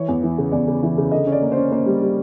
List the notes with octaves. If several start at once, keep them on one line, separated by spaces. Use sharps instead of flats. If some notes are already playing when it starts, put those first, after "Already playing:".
Already playing: E3 C#5
E2
E3
C#3
E2 D5
C#3
E3
C#3
D3 D#5
C#4
D5
A#3
C5
C#4
A#3 C5
G3
G3